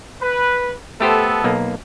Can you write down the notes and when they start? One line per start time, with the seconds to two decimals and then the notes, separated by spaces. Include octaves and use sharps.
0.20 B4
1.00 A3 B3 G4 A4 C5
1.44 B1 A#3